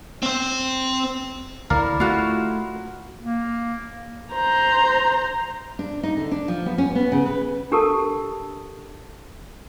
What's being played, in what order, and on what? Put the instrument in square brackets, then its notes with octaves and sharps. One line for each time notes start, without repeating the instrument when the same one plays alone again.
[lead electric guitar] C4 C5
[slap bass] D2 [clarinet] E4 [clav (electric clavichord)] A#4 D5 F5
[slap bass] A3 [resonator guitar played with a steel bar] F4 F#4
[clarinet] A#3
[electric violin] C5 A#5
[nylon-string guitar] D4
D#4
D3
D4
F3
B3
C#4
B3
C#3
B4
[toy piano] D4 G4 A4 A#4 A5